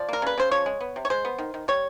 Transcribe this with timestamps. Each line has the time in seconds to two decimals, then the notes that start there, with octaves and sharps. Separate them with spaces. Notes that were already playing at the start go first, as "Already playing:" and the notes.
Already playing: F3 D5
0.09 A#3 A#4
0.22 C#3 B4
0.38 C#3 C5
0.51 F3 C#5
0.66 G#3
0.81 B3
0.96 C3
1.05 C#5
1.10 G#3 C5
1.25 B3
1.38 D#3
1.54 D#3
1.68 G3 C#5